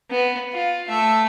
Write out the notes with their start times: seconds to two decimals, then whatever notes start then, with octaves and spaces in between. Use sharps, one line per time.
0.10 B3
0.53 F4
0.89 A3 E5